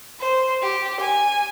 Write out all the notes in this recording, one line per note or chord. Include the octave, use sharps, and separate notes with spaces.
C5
G4
G#5